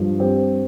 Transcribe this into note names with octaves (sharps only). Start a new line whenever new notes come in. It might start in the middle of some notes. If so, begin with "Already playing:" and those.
Already playing: G2 F3
C4 G4